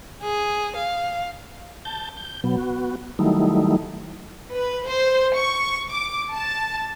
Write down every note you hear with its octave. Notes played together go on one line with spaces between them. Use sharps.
G#4
F5
A5 G6
G6
B2 F#3 B3
B3 F#4
D#3 F#3 G3 A3 D#4 E4
B4
C5
C#6
D6
A5